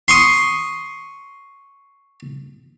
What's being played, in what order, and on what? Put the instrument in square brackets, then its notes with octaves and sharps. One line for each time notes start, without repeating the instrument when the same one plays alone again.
[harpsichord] C6 C#6 D#6